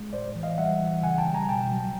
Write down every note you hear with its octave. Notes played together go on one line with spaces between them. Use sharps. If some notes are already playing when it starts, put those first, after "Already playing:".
Already playing: G#3
A2 C5 D5
E3
D#5 F5
G3 E5 F#5
E3
C#3 F#5 G#5
G5 A5
G3
G#5 A#5
B2 G5 A5
F#3